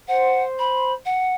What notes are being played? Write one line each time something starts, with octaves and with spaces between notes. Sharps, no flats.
C5 F#5
B5
F#5